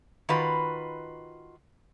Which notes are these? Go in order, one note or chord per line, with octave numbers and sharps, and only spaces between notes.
D#3 F4 F#4 B4